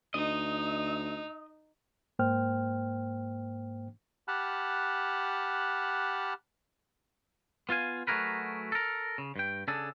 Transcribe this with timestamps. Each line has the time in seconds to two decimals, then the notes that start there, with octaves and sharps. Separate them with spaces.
0.14 D2 D#4 D#5
2.19 G#2 A#3 C5 G5 F6
4.28 G4 F#5 A5 B5 F6 F#6
7.69 B3 F4 F5 G#5
8.07 F#3 A3 F#4 G#4 A#4 B4
8.72 A4 A#4
9.18 C#3
9.36 G2 G5
9.68 C#3 D4 G#4 A4